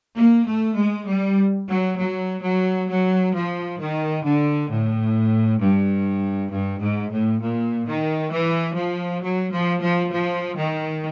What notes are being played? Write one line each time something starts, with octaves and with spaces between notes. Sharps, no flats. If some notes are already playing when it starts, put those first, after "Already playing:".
A#3
A3
G#3
G3
F#3
F#3
F#3
F#3
F3
D#3
D3
A2
G2
G2
G#2
A2
A#2
D#3
E3
F3
F#3
F3
F3
F3
D#3